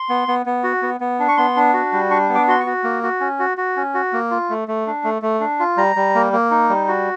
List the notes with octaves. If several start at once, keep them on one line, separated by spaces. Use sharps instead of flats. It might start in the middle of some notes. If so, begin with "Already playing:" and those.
Already playing: C6
B3
B3
B3
F#4
B3
B3
D4
C#6
B3 C6
D4
F#4
G3
D4 C#6
B3
D6
F#4 C6
C#6
F#4
A#3
F#4
C#4
F#4
F#4
C#4
F#4
A#3
F4
A3
A3
D4
A3
A3
D4
F4
G3 A#5
G3
A#3
A#3
D#4
G3
F#4